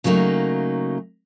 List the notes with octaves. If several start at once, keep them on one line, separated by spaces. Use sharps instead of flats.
C#3 F#3 A3 A#3 D#4